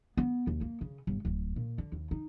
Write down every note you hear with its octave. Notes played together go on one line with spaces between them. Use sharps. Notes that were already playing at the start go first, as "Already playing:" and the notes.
B3
D#2
A#3
C#3
G1
D1
A#2
D3
D#2
D#4